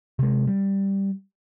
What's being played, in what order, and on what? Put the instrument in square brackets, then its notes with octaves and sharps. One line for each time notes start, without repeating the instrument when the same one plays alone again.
[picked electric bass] C3 G#3
G3